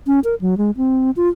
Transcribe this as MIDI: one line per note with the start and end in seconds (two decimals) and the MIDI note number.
0.07 0.20 61
0.24 0.35 70
0.41 0.57 54
0.57 0.71 56
0.77 1.11 60
1.16 1.28 65